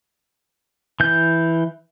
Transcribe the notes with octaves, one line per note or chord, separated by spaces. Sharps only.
E3 G6